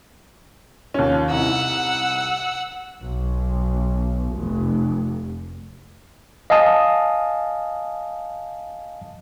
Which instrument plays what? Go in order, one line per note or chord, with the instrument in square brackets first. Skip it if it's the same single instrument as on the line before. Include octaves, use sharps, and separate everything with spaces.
[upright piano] D#2 F3 C#4
[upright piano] C2 D#4 E4 [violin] F#5 E6
[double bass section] B1
F1
[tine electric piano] D#5 F5 G#5 A5 D#6